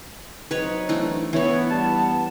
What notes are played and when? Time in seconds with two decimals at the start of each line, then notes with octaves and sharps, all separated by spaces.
0.51 F#3 C4 D#4 B4 C#5
0.89 E3 A3 D4
1.33 E3 B3 E4 B4 C#5
1.69 G3 A5